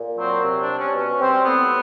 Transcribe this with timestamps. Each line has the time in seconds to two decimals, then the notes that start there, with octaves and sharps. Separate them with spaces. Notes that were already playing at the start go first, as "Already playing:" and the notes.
Already playing: A#2
0.18 F#3 C4
0.44 C3
0.60 D4
0.69 G3
0.78 C#4
0.94 B2 C#4
1.19 G3 C4
1.44 A2 B3